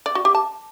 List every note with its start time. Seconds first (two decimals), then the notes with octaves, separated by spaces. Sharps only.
0.06 D5
0.15 F#4
0.25 G4
0.35 A5